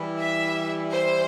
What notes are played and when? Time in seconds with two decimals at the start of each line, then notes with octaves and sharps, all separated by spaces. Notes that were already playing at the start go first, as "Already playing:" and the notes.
Already playing: E3 G3 E4
0.20 E5
0.91 C5